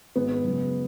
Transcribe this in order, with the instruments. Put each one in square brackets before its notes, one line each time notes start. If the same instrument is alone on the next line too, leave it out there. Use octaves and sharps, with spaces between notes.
[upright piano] G#1 G#2 G#3 [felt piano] B3
[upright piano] F#2 C#3 G#3